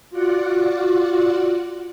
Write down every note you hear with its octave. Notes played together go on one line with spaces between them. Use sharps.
F4 F#4 D5 F#5